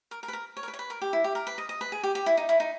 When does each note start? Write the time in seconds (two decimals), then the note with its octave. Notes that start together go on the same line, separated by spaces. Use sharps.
0.11 A#4
0.23 A#4
0.28 B4
0.33 A#4
0.57 C#5
0.63 A#4
0.68 B4
0.74 C#5
0.79 B4
0.90 A#4
1.01 G4
1.13 E4
1.24 G4
1.35 A#4
1.47 B4
1.58 D#5
1.69 D#5
1.81 B4
1.92 G#4
2.03 G4
2.15 G4
2.26 E4
2.37 D#4
2.49 E4
2.60 D#4